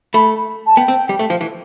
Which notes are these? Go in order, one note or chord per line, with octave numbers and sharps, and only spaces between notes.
A3 B5
A5
B3 G5
C4
G3
A3
F3
E3